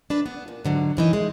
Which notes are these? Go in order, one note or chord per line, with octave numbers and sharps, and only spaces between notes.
D4 B4
B3
A#2
G#2 D3 F#3
F#2 E3 D#4
G#3